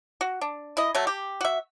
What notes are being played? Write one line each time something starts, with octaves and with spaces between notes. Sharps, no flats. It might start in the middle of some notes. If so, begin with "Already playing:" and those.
F#4
D4
E4 D#5
F#3 A3
G4
F#4 E5